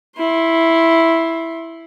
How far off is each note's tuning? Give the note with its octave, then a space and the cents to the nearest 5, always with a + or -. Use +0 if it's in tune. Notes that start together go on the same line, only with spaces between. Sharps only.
E4 +0 C6 +20